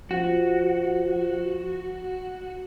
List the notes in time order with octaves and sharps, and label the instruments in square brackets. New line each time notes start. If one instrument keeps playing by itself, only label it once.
[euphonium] F3 [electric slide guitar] F#4